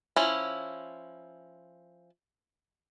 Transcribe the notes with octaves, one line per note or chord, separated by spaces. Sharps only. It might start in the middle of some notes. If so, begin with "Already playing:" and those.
F3 C#4 E4